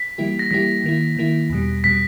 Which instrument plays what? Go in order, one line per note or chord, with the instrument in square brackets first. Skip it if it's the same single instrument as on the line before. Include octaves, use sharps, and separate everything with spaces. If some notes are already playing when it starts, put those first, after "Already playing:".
Already playing: [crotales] B6
[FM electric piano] E3 G3 A#3 E4 G4
[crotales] A#6
[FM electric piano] E3 G3 A#3 E4 G4 [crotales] B6
[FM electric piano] D#3 A#3 E4
D#3 A#3 E4
E2 B2 G3
[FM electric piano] B2 G3 [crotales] B6